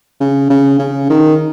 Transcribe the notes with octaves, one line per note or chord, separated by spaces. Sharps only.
C#3
C#3
C#3
D#3